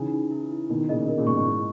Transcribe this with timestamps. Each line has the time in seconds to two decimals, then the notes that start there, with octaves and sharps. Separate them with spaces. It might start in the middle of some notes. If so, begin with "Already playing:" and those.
Already playing: C#3 E3 D#4 G#5
0.12 D#4
0.31 E4
0.51 E4
0.69 B2 D#3 D#4
0.89 A#2 C#3 D#5
1.08 A#4
1.18 A#2 C#3
1.27 G#2 B2 C#6
1.37 G#2
1.46 E4